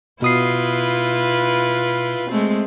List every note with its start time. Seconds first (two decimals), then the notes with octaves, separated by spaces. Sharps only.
0.22 B2 E4 F4 B4 D#6 C7
2.29 G#3 A3 C4